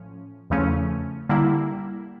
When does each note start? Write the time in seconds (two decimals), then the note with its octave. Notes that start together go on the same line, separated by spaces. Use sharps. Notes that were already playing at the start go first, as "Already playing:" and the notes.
Already playing: A2 F3 C#4
0.50 E2 C#3 F3 A3 C#4
1.29 D3 G3 A#3 E4